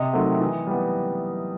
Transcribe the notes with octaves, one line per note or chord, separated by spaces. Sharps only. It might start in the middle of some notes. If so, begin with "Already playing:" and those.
Already playing: C3 D#5
D#3 F#3 A3 C4
E3
G3 B3